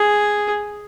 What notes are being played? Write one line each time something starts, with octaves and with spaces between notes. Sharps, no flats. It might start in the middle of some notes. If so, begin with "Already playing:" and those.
Already playing: G#4